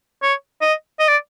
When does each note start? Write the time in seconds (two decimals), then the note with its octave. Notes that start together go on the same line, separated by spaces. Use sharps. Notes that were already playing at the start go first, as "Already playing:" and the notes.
0.22 C#5
0.61 D#5
1.00 D#5
1.08 D5